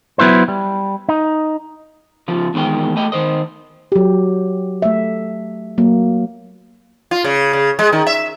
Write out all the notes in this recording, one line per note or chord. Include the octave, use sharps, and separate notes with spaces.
F#3 B3 E4 B4 C5
G3
D#4
C#3 F3 F4
E2 D#3 G#3 B4 G5
A3 D#5 G5
D#3 C5 D#5
F#3 G4
A3 E5
F#3 A#3
F4
C#3
C#3
G#3
D#3
E5